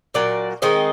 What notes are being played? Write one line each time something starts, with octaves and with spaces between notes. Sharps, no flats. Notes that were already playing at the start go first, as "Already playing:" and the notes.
A#2 F#3 A#3 D5
D#3 G#3 C4 D#5